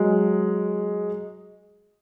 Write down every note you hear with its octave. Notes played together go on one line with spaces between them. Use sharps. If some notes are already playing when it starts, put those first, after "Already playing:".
Already playing: F#3 G#3